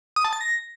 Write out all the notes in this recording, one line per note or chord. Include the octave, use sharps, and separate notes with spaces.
D#6
A5
A6
A#6